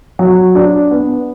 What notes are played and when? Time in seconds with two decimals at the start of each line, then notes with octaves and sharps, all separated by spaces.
0.19 F#3
0.55 D4
0.91 B3